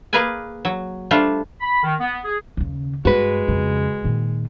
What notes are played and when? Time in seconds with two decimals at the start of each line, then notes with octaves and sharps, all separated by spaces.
0.13 A#3 G#4 A#4 B4 D5 G#5
0.65 F#3
1.11 G3 A3 D4 F4 C5 F5
1.60 B5
1.83 D#3
2.00 B3
2.24 G#4
2.57 D#2 C#3
3.05 G2 G#3 F#4 B4
3.48 F2 C#3
4.04 A#2 D#3